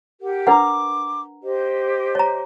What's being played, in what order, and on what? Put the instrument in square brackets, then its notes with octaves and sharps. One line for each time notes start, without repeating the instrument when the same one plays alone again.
[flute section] G4 A#4 F#5
[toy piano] D4 B4 F#5 [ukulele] A#4 A#5 [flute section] D6
[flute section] G4 C5 D#5
[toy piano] C#5 A#5